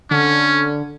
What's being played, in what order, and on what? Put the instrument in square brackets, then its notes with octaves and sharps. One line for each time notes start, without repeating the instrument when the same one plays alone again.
[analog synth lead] D3 [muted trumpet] C#4